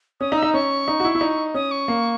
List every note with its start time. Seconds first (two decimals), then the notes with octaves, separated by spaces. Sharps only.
0.20 C#4 D#6
0.32 D#4
0.37 E6
0.43 D#4
0.54 C#4 C#6
0.88 D#4
1.00 F#4
1.05 E4
1.15 E4
1.21 D#4
1.54 C#4 D#6
1.71 C#6
1.88 A#3